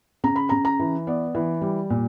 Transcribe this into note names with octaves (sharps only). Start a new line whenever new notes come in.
C#3 A#5
B5
C#3 A#5
A#5
E3
B3 D5
E3
G3
A#2